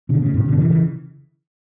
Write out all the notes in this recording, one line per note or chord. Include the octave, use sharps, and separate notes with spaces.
B2 D3
A2 C#3
G2 B2
B2 D3
C#3 E3
C#3 E3